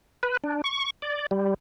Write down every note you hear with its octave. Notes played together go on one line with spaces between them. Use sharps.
B4
D4
C#6
D5
G3